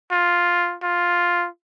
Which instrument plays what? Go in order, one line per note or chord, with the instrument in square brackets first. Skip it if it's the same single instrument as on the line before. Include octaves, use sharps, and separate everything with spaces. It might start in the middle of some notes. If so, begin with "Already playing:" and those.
[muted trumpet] F4
F4